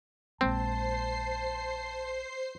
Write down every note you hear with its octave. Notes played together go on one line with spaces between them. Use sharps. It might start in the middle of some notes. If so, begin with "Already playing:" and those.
A#1 G#3 A#3 C4 C5 A5 C7